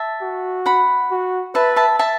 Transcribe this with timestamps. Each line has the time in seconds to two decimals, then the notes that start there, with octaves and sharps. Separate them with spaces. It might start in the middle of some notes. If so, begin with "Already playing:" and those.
Already playing: E5 A5
0.22 F#4
0.66 F#5 B5
1.11 F#4
1.55 B4 E5 A5
1.76 E5 A5
1.99 E5 A5